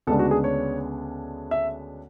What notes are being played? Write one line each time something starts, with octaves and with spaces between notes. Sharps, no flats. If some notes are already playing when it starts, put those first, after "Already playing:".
D2 C#3 G#3 B3 D4 A4
F#4
G#4
C#5
E5